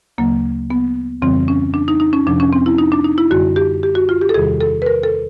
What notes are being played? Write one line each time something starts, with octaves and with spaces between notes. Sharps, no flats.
D2 C#3 F#3 A#3
B3
F2 C#3 E3 G3 C4
C#4
D4
D#4
D#4
C#4
F2 C3 F3 D4
C#4
C4
E4
D#4
D4
D#4
E4
F#2 D3 G3 F#4
G4
G4
F#4
F4
G4
A4
E2 C3 D#3 G3 G#4
A4
B4
A#4
A4